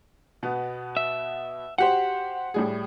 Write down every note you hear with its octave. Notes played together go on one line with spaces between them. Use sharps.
B2 B3
E5
F#4 G4 C5 F#5
A2 G3 G#4